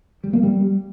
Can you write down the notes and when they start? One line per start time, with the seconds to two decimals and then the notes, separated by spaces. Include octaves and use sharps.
0.24 G3
0.33 A#3
0.43 G3